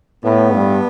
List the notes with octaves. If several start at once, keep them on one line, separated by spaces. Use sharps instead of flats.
A2 B3
G2